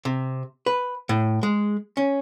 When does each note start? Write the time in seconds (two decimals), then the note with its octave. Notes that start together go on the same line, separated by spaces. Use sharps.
0.05 C3
0.66 B4
1.09 A2
1.43 G#3
1.97 C#4